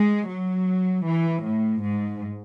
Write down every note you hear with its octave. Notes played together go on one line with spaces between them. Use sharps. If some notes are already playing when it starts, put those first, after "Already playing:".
Already playing: G#3
F#3
E3
A2
G#2